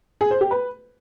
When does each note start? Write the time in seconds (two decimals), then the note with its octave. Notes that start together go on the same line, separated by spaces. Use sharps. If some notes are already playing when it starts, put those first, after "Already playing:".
0.21 G#4
0.31 C5
0.41 G4
0.51 B4